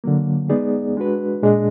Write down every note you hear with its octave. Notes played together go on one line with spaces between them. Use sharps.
D3 F#3 A#3
G#3 B3 D#4 G#4 D5
G#3 D4 F#4 B4
A#2 G#3 D4 G#4 D#5